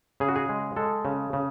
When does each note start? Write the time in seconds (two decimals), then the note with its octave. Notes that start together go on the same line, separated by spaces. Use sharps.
0.20 C#3 G#4
0.28 F#4
0.36 G#4
0.49 G#3
0.76 G#3 A4
1.05 C#3
1.33 C#3